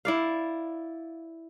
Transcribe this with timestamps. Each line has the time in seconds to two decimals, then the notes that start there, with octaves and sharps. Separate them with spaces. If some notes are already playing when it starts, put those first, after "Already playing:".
0.05 E4 D5 F5